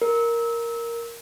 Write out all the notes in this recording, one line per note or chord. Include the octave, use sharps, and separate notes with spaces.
A#4